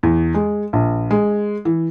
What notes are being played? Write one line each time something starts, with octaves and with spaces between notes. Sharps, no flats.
E2
G#3
A#1
G#3
E3